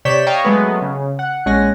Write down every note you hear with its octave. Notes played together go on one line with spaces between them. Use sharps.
C3 C#5 D5 G6 B6 E7
C#5 D#5 F5 G5 A#5 C#6
F#3 G#3 A3 B3
C#3
F#5
A#1 G#3 C#4 F#5 G#5 A#6